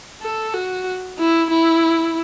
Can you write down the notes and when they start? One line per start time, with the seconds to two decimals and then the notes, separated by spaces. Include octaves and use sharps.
0.22 A4
0.54 F#4
1.19 E4
1.50 E4